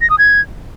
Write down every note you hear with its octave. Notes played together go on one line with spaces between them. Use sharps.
A#6
D#6
G#6